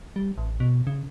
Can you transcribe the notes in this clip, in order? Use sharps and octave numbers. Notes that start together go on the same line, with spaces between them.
G3
A1
B2
C#3